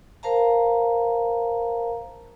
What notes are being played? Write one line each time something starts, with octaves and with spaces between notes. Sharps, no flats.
A#4 C5 F5 A5 A#5